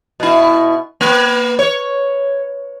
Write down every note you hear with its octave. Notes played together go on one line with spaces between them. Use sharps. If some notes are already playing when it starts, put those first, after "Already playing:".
B2 E4
A#3 B4
C#5